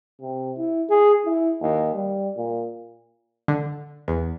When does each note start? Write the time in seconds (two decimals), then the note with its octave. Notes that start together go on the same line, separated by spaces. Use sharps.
0.21 C3
0.58 E4
0.89 G#4
1.25 E4
1.61 D#2
1.94 G3
2.37 A#2
3.48 D3
4.08 E2